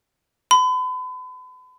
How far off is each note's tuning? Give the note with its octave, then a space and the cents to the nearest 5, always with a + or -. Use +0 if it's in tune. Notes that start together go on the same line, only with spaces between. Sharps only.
B5 +40